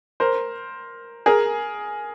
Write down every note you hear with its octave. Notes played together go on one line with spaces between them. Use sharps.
A#4 C5
G#4 A#4